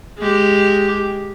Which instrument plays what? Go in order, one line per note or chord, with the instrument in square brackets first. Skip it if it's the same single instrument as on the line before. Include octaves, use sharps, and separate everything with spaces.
[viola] G#3 G4